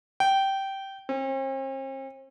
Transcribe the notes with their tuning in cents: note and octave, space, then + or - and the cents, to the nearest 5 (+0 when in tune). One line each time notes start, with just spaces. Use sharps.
G5 -15
C4 +45